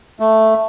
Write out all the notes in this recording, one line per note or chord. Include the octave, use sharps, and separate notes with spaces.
A3